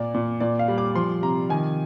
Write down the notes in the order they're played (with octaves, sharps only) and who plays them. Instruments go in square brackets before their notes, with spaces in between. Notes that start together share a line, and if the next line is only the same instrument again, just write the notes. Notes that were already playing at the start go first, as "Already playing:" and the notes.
Already playing: [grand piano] A#2 D5
A#2
A#2 D5
F5
G3
D6
F3 C6
C3 A#5
D#3 G#5